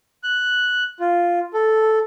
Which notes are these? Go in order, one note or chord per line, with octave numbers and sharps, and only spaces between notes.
F#6
F4
A4